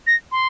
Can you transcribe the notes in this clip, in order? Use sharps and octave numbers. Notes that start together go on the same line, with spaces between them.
A#6
C6